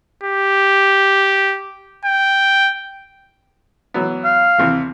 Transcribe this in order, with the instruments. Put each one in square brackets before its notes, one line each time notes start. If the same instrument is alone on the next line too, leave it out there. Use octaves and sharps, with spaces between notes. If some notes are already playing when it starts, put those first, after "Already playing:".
[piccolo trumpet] G4
G5
[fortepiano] E3 F#3 B3
[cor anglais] F5
[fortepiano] D#2 C3 E3